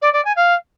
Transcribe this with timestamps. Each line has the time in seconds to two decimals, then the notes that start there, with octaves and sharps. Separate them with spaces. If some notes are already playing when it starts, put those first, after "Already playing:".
0.02 D5
0.13 D5
0.25 G#5
0.36 F5